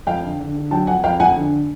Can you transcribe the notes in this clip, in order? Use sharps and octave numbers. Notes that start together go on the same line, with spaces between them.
F2 F5 G5
D3
D3
D3
F#3 G5 A5
F2 F#5 G#5
F2 F5 G5
F2 F#5 G#5
D3